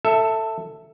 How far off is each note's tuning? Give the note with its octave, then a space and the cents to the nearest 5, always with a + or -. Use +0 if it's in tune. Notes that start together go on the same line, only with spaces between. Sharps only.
A4 +15 E5 +0